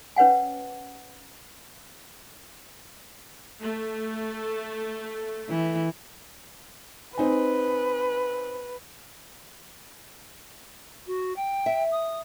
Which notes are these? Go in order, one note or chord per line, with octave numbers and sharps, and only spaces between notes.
C#4 B4 C#5 F#5 G#5
A3
E3
C4 D#4 B4 G#5
F#4
G5
E5
D#6